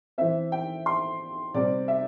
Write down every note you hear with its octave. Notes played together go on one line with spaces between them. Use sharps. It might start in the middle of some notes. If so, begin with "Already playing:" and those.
E3 C4 E5
G5
C6
C3 G3 C4 D5
E5